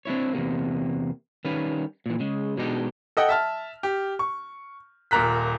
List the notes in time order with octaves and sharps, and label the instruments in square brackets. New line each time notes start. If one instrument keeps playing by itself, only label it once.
[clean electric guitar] C4 D4 E4 C#5
E2 C3 A#3
D#3 G3 C#4 B4 F5
A#2 E3
C#3 G#3
B2 G#3 D4 D#4 G4
[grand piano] A4 D#5 F#5 G5
E5 A5 F6
G4
C#6
D#1 A#2 A#4 A#5 F#6 B6